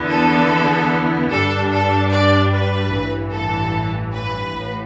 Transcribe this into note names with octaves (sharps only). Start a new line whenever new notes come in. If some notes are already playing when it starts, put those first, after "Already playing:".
Already playing: E2 D3 B3 E4
A4
G2 G3 D4 A4
A4
D5
B4
A1 G2 E3
A4
B4
A1 A2